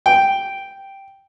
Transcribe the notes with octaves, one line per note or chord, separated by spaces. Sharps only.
G5